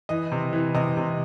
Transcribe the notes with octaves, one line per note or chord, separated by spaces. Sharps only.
E3 D#5
C3
E3
C3 D#5
C3